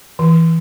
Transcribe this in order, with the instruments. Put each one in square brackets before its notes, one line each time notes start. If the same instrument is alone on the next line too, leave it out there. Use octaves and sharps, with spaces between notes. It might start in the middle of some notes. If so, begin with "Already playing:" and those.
[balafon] E3